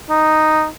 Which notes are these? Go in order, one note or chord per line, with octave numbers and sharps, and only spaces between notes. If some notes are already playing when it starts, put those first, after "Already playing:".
D#4